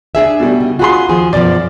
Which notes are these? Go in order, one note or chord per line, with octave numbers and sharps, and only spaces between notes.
D4 G#4 E5
B2 G3
C#3
F4 F#4 G#4 B5 C6
D#2 F3 G#4
F#2 B2 F3 D5